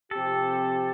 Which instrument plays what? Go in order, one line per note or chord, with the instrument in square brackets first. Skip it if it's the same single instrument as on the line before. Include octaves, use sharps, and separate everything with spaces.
[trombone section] C3 F3 C4 G4 [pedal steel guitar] A4